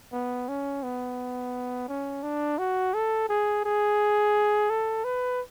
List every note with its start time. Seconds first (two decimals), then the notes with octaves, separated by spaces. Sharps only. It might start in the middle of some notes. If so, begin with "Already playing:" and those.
0.13 B3
0.49 C#4
0.83 B3
1.88 C#4
2.23 D4
2.59 F#4
2.94 A4
3.29 G#4
3.64 G#4
4.70 A4
5.05 B4